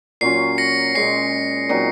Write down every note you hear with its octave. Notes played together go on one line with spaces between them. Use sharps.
A#2 F#3 C#4 F4 C7
A#6 C#7
A#2 G#3 C#4 C7
A#2 F#3 C4 D#4